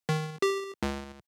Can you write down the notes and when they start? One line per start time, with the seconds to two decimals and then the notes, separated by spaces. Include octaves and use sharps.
0.09 D#3
0.42 G4
0.83 C#2